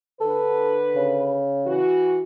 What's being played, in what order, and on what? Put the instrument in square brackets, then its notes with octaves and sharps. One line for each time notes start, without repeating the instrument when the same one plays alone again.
[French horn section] D3 B4 [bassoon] A4
[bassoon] C#3
[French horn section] E3 F#4